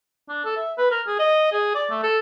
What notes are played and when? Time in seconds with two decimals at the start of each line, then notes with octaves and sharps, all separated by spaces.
0.29 D4
0.45 A4
0.57 E5
0.78 B4
0.91 A#4
1.07 G#4
1.19 D#5
1.52 G#4
1.75 D5
1.91 A3
2.03 A4